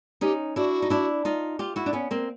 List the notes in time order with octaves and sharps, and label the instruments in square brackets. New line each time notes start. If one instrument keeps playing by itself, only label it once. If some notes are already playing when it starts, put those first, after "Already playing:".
[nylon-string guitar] C#4 D#4 [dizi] G4
[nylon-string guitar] D4 E4 [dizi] F#4
[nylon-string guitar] D#4
D4 E4
D#4 F4
F4 G4
E4 F#4
D4
B3 C#4
A#3 C4